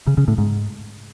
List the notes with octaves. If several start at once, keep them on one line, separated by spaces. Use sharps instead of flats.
C#3
C#3
A2
G#2